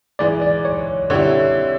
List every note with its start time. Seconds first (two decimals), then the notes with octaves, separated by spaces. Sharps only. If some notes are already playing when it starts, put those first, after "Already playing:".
0.19 G#2 E3 G#3 D5
0.42 D5
0.65 C#5
1.10 D3 G3 C4 E4 C#5